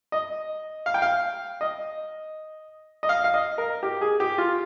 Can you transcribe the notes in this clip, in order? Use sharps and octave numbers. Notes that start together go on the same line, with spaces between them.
D#5
F5
G5
F5
D#5
D#5
F5
F5
D#5
A#4
G4
G#4
G4
F4